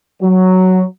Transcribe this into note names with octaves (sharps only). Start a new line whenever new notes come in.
F#3